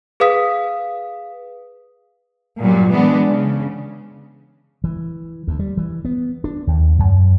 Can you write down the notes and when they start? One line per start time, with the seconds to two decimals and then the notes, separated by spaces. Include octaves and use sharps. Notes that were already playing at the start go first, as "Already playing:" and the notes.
0.20 G#4 B4 F5 D#6 B6
2.60 G2 A#2 F#3 G3
2.91 E3 G#3 B3 D4
3.29 C#3
4.84 E3
5.47 D2
5.59 G3
5.77 E3
6.05 B3
6.44 D4
6.67 D#2
6.99 F#2